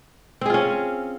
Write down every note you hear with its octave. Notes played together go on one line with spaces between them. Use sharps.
C4 C#4 F4 G#4